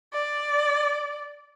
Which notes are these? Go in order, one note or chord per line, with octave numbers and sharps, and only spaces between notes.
D5